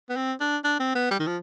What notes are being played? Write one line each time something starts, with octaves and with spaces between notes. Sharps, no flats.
B3
C4
D4
D4
C4
B3
G3
D#3
F3